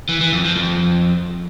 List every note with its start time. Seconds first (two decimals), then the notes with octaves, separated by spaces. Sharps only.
0.09 E3
0.21 E3
0.32 F2
0.44 F3
0.56 F2